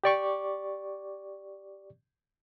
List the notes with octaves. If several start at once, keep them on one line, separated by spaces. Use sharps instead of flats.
G4 D5 C#6 D6